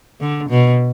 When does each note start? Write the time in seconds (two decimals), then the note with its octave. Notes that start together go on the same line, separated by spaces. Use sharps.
0.20 D3
0.50 B2